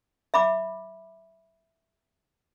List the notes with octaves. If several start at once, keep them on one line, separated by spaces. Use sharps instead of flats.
E5 B5 D6